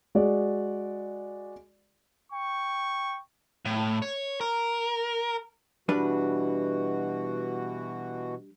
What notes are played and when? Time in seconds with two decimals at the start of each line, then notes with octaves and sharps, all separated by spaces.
0.15 G#3 F#4 G#4 D5
2.33 G5 C#6
3.65 A2
4.02 C#5
4.41 A#4
5.89 B2 E3 G3 D4 F#4 B4